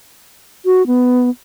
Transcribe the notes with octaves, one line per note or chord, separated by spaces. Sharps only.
F#4
B3